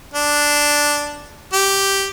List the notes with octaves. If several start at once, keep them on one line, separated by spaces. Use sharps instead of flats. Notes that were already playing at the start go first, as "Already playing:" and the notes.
D4
G4